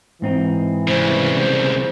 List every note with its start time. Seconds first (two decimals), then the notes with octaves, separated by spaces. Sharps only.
0.22 G#2 E3 C4 D#4
0.88 C2 C#3 C5